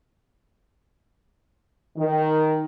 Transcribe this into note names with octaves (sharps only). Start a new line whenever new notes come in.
D#3